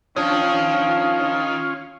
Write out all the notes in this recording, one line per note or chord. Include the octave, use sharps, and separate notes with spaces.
D#3 F3 C#4 D4 F4 C#5